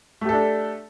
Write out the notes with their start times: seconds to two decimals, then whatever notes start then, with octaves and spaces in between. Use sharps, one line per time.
0.21 A3
0.25 G4
0.29 A4
0.33 D4